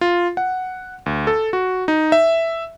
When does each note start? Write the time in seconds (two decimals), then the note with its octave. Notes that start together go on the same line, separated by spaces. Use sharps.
0.01 F4
0.37 F#5
1.06 D2
1.27 A4
1.53 F#4
1.88 D#4
2.12 E5